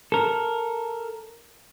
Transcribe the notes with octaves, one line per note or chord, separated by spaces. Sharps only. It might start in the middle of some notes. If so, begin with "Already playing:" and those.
A4 A#4